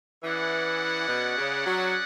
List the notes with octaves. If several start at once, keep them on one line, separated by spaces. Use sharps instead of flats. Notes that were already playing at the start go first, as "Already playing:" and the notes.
E3 C#4 G#4 D5 F#5
B2
C#3
F#3